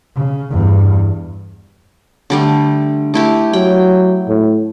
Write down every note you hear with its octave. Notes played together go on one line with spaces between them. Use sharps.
C#3
E2 G2
D3 G3 A3
A3 E4 G4
F#3 G5
A2